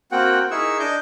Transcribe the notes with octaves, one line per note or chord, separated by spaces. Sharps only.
A#3 C4 F#4 F#5 G5
D#4 E4 G#4 A#4 C#6 E6
D4 D#5 D6 G6